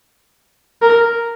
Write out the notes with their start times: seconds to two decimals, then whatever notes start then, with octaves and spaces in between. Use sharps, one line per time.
0.82 A#4